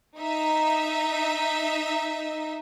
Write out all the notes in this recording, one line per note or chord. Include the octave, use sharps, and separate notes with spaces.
D#4 E5